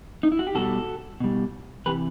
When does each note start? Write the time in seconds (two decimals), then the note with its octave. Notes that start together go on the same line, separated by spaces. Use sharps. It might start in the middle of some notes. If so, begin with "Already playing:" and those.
0.23 D#4
0.32 E4
0.39 F#4
0.47 G4
0.55 B2 G3 F#4 A4
1.20 B2 G3
1.86 C3 E3 G4 B4